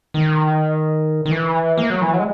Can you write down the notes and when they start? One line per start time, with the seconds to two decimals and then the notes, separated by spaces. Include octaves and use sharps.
0.14 D#3
1.25 D#3
1.31 E3
1.78 A#3
1.90 F#3
2.01 E3
2.13 F#3
2.19 G#3